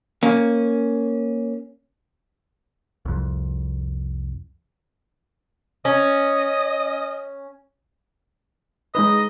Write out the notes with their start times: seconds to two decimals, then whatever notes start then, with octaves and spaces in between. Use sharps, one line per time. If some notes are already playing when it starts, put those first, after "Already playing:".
0.23 A#3 C#4
3.05 C2 F2
5.85 C#4 D#5
8.95 G#3 D#4 B4 D#5